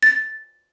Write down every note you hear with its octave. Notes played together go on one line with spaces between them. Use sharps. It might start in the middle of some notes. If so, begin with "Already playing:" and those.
A6